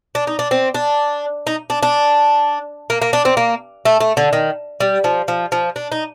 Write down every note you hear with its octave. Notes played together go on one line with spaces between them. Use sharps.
D4
D#4
D4
C4
D4
D#4
D4
D4
A#3
A#3
D4
C4
A#3
A3
A3
D3
D#3
G3
F3
F3
F3
D4
D#4